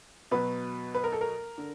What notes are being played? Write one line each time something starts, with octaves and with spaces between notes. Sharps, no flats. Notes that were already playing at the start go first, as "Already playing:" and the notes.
B2 F#3 B4
B4
A#4
A4
A#4
D3